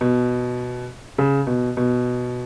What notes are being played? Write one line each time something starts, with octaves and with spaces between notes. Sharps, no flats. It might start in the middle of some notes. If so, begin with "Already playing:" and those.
B2
C#3
B2
B2